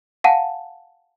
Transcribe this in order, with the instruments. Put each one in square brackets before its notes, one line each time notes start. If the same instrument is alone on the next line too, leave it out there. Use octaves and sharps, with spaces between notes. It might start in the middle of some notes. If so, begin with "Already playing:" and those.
[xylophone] F5 F#5 G#5 A5 D#7